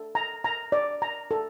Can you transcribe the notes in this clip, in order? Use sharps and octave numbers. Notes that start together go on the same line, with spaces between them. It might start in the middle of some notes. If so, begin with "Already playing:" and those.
Already playing: A4
A#5
A#5
D5
A#5
A4